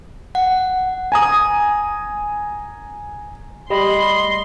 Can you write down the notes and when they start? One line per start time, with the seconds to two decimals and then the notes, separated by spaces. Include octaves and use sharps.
0.35 F#5
1.12 G#5 A#5 D#6
3.70 G3 D#5 B5 C6